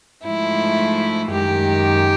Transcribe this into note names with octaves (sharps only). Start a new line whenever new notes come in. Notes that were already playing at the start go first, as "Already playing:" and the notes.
G#2 F3 A3 E4
F#2 D#3 G#3 G4